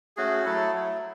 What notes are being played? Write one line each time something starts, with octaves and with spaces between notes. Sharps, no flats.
A3 C#4 F#4 G#4
G#4
F#3 A3 E4 A4
F#3 A3 E4